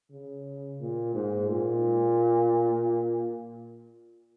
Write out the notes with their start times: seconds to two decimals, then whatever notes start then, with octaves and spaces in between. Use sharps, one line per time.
0.12 C#3
0.81 A#2
1.15 G#2
1.49 A#2